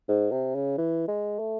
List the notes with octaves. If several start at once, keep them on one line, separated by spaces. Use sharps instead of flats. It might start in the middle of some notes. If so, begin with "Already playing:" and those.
G#2
C3
C#3
E3
G#3
A3